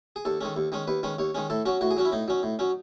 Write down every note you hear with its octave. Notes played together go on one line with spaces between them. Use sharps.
G#4
D#2 A4
D#3 G#3 C#4
D#2
D#3 G#3 C#4
D#2 B4
D#3 G#3 C#4
D#2 C#5
D#3 G#3 C#4
A2 A4
F#3 C#4 F#4
A2 F#4
G#4
F#3 C#4 F#4
E4
A2 D#4
F#3 C#4
A2
F#3 C#4